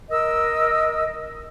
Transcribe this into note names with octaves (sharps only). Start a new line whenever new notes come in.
A#4 D#5 E6